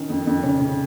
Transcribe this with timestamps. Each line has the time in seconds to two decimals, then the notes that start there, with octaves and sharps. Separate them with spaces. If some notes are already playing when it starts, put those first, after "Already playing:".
Already playing: D#3 C#4
0.10 F2
0.27 F2
0.43 C#3 C#4
0.60 C#3